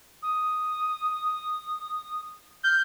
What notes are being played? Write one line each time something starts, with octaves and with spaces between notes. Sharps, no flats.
D#6
F6 G6